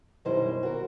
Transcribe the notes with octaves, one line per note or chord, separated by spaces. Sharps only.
F#2 B2 D#3 G3 E4 C5
F#4 A#4